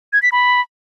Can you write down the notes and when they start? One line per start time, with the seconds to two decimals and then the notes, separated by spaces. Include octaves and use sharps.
0.13 G#6
0.22 B6
0.32 B5